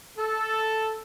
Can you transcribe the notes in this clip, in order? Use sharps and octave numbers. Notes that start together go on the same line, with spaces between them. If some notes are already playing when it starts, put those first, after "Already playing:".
A4